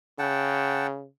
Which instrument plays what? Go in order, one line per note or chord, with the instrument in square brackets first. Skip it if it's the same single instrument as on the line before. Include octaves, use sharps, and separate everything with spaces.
[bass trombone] C#3 [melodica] F#5 G5 A5